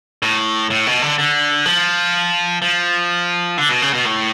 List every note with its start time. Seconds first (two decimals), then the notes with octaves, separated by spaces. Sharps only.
0.22 A2
0.70 A2
0.86 B2
1.02 D3
1.19 D3
1.65 F3
2.62 F3
3.58 D3
3.69 B2
3.82 C#3
3.93 B2
4.05 A2